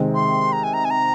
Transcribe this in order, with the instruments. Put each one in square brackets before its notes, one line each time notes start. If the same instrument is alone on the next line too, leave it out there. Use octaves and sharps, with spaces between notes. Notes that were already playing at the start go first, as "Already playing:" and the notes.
Already playing: [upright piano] C3 D#3 G#3 C4
[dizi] C6
A#5
G#5
A#5
G#5
A#5